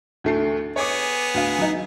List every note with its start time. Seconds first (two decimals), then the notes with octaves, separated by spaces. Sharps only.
0.24 D2 A3 C7
0.76 B3 G#4 C#5 D6
1.34 D2 F5
1.58 F#3 D#4